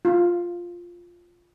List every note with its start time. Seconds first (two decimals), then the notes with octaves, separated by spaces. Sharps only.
0.05 F4